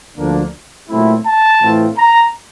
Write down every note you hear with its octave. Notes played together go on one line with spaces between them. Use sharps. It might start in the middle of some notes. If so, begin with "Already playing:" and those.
D2 D3 F3 A#3 D4
A#2 F#3 A3 C4 E4
A5
A2 E3 A3 C4 F4
A#5